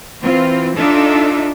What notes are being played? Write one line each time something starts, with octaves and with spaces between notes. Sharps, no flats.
E3 C4 F4
D4 D#4 F4 A4 E5